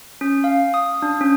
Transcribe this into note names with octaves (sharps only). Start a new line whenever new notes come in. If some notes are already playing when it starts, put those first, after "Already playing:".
C#4
F5
D#6
D4
C#4